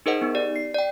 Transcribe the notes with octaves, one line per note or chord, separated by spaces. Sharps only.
D#4 G#4 A#4 C5 D#5 F#5
B3 D#4
G4 D5
C7
D5 G5